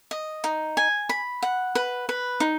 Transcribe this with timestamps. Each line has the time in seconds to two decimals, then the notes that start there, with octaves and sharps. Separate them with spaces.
0.11 D#5
0.44 D#4
0.77 G#5
1.09 B5
1.42 F#5
1.75 B4
2.09 B4
2.40 D#4